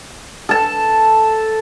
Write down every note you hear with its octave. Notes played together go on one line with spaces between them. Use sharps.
A4 A5